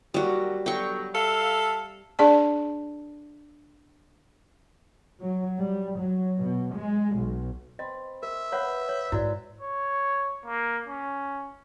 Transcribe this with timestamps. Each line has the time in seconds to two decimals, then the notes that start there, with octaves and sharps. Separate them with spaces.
0.14 D#3 F#3 G3 A#3 F#4
0.66 B2 D3 F#3 G5 C#6
1.15 A4 E5 F5
2.19 D4 G#4 D5 A5
5.21 F#3
5.58 G3
5.98 F#3
6.38 B2
6.75 G#3
7.15 B1
7.79 C4 D#5 B5
8.23 A#4 E5
8.52 B4 C#5 F5 F#5
8.89 C#5
9.12 G#2 E4 F#4 D5
9.61 C#5
10.46 A#3
10.87 C#4